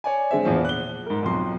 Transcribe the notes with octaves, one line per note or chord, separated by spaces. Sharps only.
C#5 D5 G#5
D3 G#3 C4 E5
E2 A#2 F3
F#6 G7
G#2 A#4
B1 F2 C6